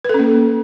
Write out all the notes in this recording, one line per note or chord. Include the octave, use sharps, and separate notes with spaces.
A#3 C#4 A4 B4